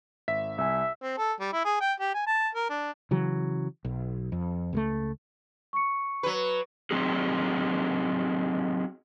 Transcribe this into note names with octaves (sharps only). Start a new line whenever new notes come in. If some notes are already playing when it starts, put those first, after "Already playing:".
G#1 E5 B6
C2 E5 G#5
C4
A4
G3
E4
G#4
G5
G4
G#5
A5
A#4
D4
C#3 E3 F#3
B1
F2
C#2 G#3 A3
C#6 C#7
F#3 B4
F#3 C4 D#4 F#4 G#4